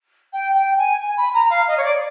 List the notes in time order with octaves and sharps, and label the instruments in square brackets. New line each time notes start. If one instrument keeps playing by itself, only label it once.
[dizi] G5
G5
G#5
G#5
B5
A#5
F5
D#5
C#5
D5